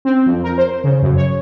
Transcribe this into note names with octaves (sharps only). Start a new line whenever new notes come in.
C4
F2
A#4
C5
C#3
F#2
C#5